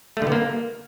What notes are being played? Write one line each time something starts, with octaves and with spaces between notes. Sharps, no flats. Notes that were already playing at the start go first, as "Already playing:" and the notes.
A3
D3
B3
A#3